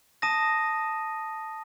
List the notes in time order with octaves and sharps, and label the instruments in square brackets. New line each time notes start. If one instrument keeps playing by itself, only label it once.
[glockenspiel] A5 D#6 A#6 D#7